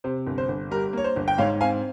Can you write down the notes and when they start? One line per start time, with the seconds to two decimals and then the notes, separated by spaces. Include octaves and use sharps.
0.04 C3 C5
0.27 G1
0.38 C5
0.48 G1
0.71 G3 A#4
0.93 A#3 C#5
1.04 C5
1.16 G1
1.28 G5
1.38 G#2 C#5 F5
1.61 C4 F5 G#5